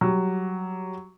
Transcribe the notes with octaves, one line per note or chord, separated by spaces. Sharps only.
F#3 G3